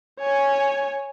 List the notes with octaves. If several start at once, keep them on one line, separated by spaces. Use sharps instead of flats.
C#5 G#5